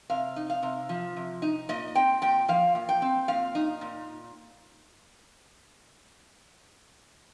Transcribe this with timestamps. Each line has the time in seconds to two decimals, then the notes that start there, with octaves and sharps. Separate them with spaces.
0.10 C3 F5
0.36 D#4
0.50 F5
0.63 C3
0.89 F3
1.16 C3
1.42 D#4
1.69 A#2 D#5
1.95 C4 G5
2.22 A#2 G5
2.48 F3 F5
2.75 A#2
2.89 G5
3.02 C4
3.28 A#2 F5
3.55 D#4
3.81 A#2